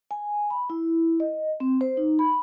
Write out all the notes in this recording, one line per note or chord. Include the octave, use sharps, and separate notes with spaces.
G#5
B5
E4
D#5
C4
C5
D#4
B5